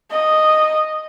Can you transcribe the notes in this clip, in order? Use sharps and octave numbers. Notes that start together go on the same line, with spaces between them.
D#5